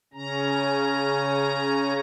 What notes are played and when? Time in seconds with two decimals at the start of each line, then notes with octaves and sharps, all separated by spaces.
0.14 C#3 C#4 A#5